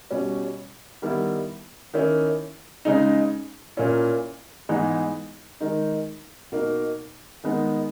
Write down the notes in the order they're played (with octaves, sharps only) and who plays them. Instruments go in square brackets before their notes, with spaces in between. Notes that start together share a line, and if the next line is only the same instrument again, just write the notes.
[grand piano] B2 G3 C#4
D#3 G3 B3 E4
D#3 A#3 C#4 E4
C#3 G#3 D#4
A#2 A#3 C#4 E4
G#2 E3 G#3 B3 D#4
D#3 G#3 D#4
B2 A#3 D#4
D#3 G#3 B3 D#4